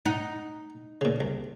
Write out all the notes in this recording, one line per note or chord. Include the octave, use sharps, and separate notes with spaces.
D#4 F#5
A#2 C#3
C2